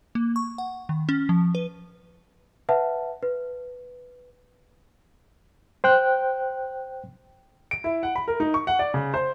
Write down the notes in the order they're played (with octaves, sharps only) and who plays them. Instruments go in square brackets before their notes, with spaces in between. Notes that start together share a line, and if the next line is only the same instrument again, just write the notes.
[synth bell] A#3
C#6
F#5
D#3
C#4
F3
B4
[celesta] B4 E5 F#5 A5
B4
[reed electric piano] C5 G5 F#6
[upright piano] D7
E4
F#5
B5
A#4
D#4
C#6
F#5
D5
C#3
C5